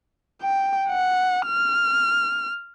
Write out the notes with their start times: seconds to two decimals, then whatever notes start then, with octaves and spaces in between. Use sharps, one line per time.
0.42 G5
0.89 F#5
1.46 F6